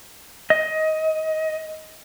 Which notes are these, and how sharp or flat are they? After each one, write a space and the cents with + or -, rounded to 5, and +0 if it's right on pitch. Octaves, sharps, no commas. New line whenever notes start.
D#5 +20